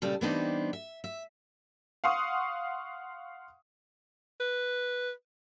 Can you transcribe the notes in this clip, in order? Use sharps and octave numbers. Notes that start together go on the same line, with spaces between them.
A#2 C#3 G3 A4
E3 G3 B3 C4 D4 D#4
E5
E5
F5 F#5 C6 C#6 D#6
B4